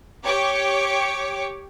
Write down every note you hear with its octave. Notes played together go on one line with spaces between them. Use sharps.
G4 C#5 C#6 D6